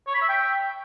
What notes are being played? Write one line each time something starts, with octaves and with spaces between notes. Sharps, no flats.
C#5
B5
E5
G5